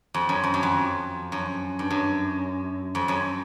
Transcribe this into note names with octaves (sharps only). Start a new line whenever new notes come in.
F2
F#2
F2
F#2
F2
F#2
G2
F#2
F2
F#2